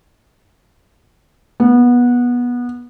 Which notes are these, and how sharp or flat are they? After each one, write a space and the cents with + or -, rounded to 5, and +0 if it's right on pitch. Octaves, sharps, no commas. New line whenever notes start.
B3 -20